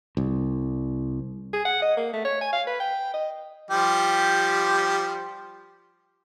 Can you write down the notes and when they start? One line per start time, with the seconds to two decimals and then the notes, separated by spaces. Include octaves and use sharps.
0.17 C2
1.53 G#4
1.65 F#5
1.82 D#5
1.97 A#3
2.13 A3
2.25 C#5
2.41 G#5
2.52 F5
2.67 B4
2.80 G5
3.13 D#5
3.71 F3 G3 G4